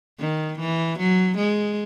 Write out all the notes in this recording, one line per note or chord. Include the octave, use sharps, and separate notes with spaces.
D#3
E3
F#3
G#3